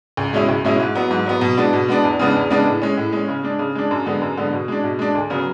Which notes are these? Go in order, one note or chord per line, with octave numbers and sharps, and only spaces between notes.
C#2
B2 G#3 C#4 E4
C#2
B2 G#3 C#4 E4
G#2
F#3 B3
G#2
F#3 B3
B2
G#3 B3 D4
B2
G#3 B3 D4
E2
C#3 G#3 B3 D4
E2
C#3 G#3 B3 D4
A2
G#3 C#4
A2
G#3 C#4
C#3
G#3 D4
C#3
G#3 D4
F#2
D3 G#3 B3
F#2
D3 G#3 B3
B2
G#3 D4
B2
G#3 D4
D2
C#3 F#3 B3